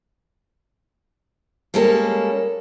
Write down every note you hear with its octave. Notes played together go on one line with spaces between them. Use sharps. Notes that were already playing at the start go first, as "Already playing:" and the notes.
G3 G#3 A#3 C#4 A4